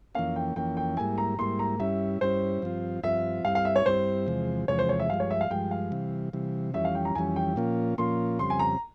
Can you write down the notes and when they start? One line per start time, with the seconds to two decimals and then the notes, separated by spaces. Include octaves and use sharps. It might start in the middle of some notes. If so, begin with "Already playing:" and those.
0.15 F2 E3 A#3 C#4 F5
0.36 G5
0.56 F2 E3 A#3 C#4 G5
0.77 G5
0.97 G#2 G3 A#3 E4 G#5
1.18 A#5
1.39 G#2 G3 A#3 E4 C6
1.59 A#5
1.80 G2 G3 C#4 E4 E5
2.21 G2 G3 C#4 E4 C5
2.62 G2 F3 C4 F4
3.03 G2 F3 C4 F4 E5
3.45 G2 G3 C4 E4 F5
3.55 F5
3.65 E5
3.76 C#5
3.86 G2 G3 C4 E4 C5
4.27 E2 C3 F3 G#3
4.68 E2 C3 F3 G#3 C#5
4.79 C5
4.89 C#5
5.00 E5
5.10 G2 F3 G#3 F5
5.20 C#5
5.30 E5
5.41 F5
5.50 G2 F3 G#3 G5
5.71 F5
5.92 C3 E3 G3
6.33 C3 E3 G3
6.74 F2 E3 G3 C#4 E5
6.85 F5
6.95 G5
7.05 A#5
7.15 F2 E3 G3 C#4 G#5
7.36 G5
7.56 A#2 F3 A#3 C#4 F4
7.98 A#2 F3 A#3 C#4 F4 C6
8.39 F2 C#3 G3 C4 C6
8.50 G#5
8.59 A#5